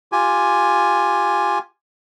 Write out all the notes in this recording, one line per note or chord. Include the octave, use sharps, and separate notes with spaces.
F4 G4 G#5